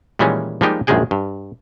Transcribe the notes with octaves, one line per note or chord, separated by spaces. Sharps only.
A#2 D#3 E3 G3 G#3 C#4
F3 G3 G#3 A#3 D#4 G4
A#1 F#2 D#3 G#3 G#4 G5
G2